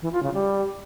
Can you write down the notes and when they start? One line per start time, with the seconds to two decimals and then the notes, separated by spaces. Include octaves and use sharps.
0.02 E3
0.12 F4
0.23 C#3
0.34 G3